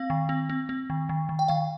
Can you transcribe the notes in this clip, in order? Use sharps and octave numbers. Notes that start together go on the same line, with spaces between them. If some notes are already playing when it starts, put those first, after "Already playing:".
Already playing: C4 F5
D#3
C4
C4
C4
D#3
D#3
D#3
G5
D#3 F5